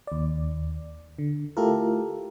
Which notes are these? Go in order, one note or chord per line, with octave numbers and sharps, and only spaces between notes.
D#2 D5
D3
A3 E4 F4 G4 A4 A#4